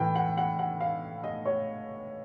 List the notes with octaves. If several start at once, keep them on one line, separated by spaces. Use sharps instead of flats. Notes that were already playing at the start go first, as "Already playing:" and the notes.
Already playing: A2 E3 A3 G5
F#5
F#5
F#5
F5
D#5
C#5